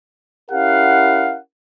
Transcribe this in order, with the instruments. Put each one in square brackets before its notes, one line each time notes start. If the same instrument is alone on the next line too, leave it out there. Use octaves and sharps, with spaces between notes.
[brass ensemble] C#4 E4 G4 A#4 F5 F#5